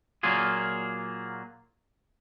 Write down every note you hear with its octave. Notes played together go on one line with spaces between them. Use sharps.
A#2 F#3 A#3 F4 G#4